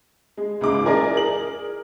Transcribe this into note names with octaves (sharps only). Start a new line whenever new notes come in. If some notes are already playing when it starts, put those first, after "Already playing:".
G#3
C#2 G#2 G#3 D6
E3 C#4 G#4 A#4 D5 D#5
G#4 A#4 F#7